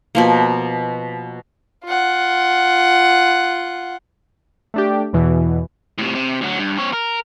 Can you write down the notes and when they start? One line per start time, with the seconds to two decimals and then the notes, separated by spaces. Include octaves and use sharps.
0.15 B2 F3 A#3
1.84 F4 F#5
4.74 A3 D4 G4
5.13 E2 B2 E3
5.98 A2 C3
6.15 C3
6.41 D2 F#3
6.59 G2
6.78 C4 C#5
6.93 A#4